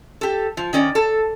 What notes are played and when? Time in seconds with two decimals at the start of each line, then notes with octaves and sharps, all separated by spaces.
0.21 G4 A4
0.57 F3
0.73 D#3 C#4 D5
0.95 A4